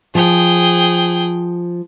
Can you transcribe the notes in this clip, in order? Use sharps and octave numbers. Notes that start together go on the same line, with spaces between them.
F3 G#4 G5